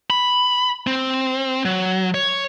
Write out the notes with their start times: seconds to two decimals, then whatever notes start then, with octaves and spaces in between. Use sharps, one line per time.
0.10 B5
0.87 C4
1.65 F#3
2.14 C#5